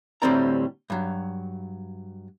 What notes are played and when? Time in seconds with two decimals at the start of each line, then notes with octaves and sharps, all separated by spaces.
0.22 D2 A2 G3 C4 D5 A#5
0.90 G2 F#3